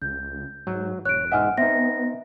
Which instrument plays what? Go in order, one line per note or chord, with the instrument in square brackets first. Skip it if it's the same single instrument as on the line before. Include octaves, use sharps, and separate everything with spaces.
[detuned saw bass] C#2 [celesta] G6
[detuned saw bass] G#2 [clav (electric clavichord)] F#3
[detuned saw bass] E1 [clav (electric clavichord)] C#5 [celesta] F#6 D7
[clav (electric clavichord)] G#2 D#5 E5 [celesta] F#5 G#5 F6
[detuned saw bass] B3 [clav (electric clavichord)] C4 D#4 [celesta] E5 A#6